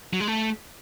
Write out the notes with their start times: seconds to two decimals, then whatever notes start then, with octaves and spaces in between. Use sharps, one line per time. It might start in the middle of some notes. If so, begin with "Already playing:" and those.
0.13 F#3
0.20 G#3
0.28 A3